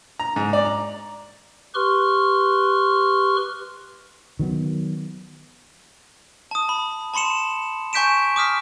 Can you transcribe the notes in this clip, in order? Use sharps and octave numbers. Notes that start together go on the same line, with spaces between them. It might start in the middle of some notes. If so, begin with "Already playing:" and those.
A#5
G#2
D5
A#5
G4 B4 C6 C#6 F6
D#3 F#3 B3
A5 D#6
B5
A5 B5 C6 C#7 E7
G#5 C#6 G6 B6 D7 E7
D6 D#6 F6 B6